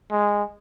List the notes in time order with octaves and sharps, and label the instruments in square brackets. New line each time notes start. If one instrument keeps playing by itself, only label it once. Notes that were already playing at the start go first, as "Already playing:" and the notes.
[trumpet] G#3